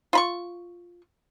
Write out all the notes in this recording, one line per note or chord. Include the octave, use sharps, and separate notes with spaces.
F4 B5 C#6